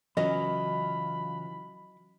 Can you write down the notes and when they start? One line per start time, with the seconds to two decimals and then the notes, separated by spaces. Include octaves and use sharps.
0.17 C#3 E3 F#3 F4 D#5 B5